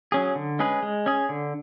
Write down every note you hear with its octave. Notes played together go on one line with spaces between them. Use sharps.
F#3 C#4 G#4
D3
G#3 C#4 G#4 B4
G#3
C#4 G#4
D3